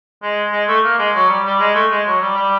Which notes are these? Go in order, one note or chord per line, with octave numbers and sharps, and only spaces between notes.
G#3
G#3
A3
A#3
G#3
F#3
G3
G3
G#3
A3
G#3
F#3
G3
G3